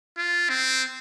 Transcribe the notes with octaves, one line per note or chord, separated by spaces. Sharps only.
F4
C4